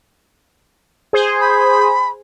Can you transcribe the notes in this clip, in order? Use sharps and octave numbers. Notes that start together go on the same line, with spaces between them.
G#4 C5
B5